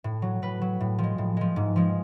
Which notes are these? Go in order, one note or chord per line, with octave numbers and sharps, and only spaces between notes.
A2
F#3
A2 B4
F#3
A2
F3
G#3
A2
F3 G#3
G#2
F3 G#3